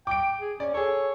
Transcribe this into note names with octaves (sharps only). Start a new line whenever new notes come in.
G5 D6 D7
G#4
C#4 D5
G#4 A4 C#5